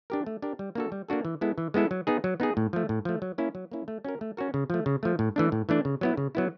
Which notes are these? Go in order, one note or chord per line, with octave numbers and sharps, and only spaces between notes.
D4 G4 A#4
A3
D4 G4 A#4
G3
A#3 D4 F#4 A4
G3
A#3 D4 F#4 A4
E3
G#3 B3 E4 A4
E3
G#3 B3 E4 A4
F#3
B3 D#4 G#4
F#3
B3 D#4 G#4
A2
F3 A3
A2
F3 A3
F#3
A#3 C#4 E4
F#3
A#3 C#4 E4
A3
C#4 F#4 A#4
A3
C#4 F#4 A#4
C#3
F3 A3
C#3
F3 A3
A2
E3 A3 D4
A2
E3 A3 D4
C#3
F#3 B3 E4
C#3
F#3 B3 E4